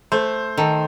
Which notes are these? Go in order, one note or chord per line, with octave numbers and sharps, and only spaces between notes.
A3 C5
D#3 A4